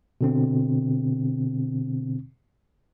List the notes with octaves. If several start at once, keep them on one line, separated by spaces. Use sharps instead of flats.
B2 D3 C4